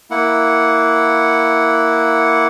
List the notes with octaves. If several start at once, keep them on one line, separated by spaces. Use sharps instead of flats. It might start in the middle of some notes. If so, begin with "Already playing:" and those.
A#3 E4 F#5